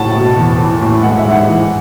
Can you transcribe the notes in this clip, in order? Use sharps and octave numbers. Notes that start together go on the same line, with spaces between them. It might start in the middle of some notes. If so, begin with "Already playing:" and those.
Already playing: A2 F#5 A5
B2
E2
E3
A2
G#3 F#5
E5
G#2
F#5
E3